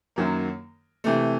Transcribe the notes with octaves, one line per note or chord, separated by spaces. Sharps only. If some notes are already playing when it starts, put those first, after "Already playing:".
F#2 D#3 F#3 A#3
C3 E3 A3